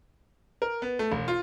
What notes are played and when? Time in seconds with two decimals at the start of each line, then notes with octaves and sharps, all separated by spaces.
0.62 A#4
0.82 B3
0.99 A3
1.12 E1
1.28 F4